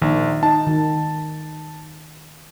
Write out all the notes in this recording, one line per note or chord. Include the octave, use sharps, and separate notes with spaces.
A#1 D#3
D#4 A5
D#3